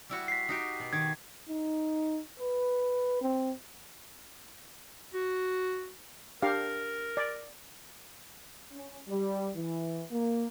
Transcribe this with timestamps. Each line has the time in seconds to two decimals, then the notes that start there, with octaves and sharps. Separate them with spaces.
0.09 G3 E4 F#4
0.28 B6 C7
0.49 D#4 F#4 G4
0.80 B2
0.93 D#3 G#6
1.48 D#4
2.39 B4
3.21 C4
5.14 F#4
6.42 D4 G4 A#4 F5
7.17 D5
8.73 C#4
9.08 G3
9.56 E3
10.11 A#3